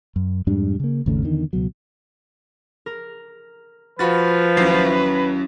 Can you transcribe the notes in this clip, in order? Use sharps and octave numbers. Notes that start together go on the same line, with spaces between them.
F#2
F2 G#2 G3 D4
C#3 A#3
G#1 D#2 C#3 A3
E2 D3 D#3
C#2 B2 F#3
A#4
F3 F4 F#4 B4 B5 A6
D#2 F#3 C#4 E4 C7